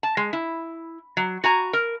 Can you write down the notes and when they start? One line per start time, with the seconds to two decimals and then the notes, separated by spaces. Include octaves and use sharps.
0.03 A5
0.17 G#3
0.33 E4
1.17 F#3
1.44 F#4 G#5 A#5
1.73 A#4